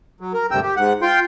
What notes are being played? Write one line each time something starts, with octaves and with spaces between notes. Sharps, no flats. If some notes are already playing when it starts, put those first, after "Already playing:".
F#3
A#4
D2 G2 C3 G5 E6
G4
G#2 F#5
F4 G5 C6